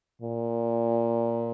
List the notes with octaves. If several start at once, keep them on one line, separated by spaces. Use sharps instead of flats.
A#2